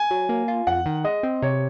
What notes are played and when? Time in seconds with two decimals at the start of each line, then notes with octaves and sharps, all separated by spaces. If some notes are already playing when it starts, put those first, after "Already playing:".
Already playing: G#5
0.11 F#3
0.29 A#3
0.48 F4
0.67 F2 F#5
0.86 D#3
1.04 G#3 D#5
1.23 C4
1.42 C3 C#5